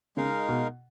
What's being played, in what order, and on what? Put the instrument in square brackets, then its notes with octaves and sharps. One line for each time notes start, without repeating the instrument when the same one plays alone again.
[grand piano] C#3 [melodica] G#3 D#4 A#4 F5
[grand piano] B2